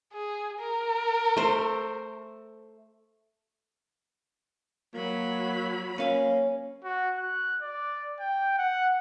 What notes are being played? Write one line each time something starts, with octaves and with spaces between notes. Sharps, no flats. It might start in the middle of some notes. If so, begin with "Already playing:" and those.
G#4
A#4
A3 C5
F#3 A#3 B5
A#3 C#4 F5 G#5
F#4
F#6
D5
G5
F#5